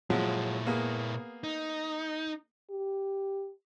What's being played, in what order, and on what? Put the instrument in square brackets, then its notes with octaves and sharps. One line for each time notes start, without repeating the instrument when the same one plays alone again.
[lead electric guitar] A#2 E4 [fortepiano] F3 F#3 G#3
[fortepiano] A#3 B3 G#4
[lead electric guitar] D#4
[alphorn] G4